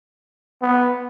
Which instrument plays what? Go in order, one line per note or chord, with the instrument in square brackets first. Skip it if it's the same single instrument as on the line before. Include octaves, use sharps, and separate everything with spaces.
[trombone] B3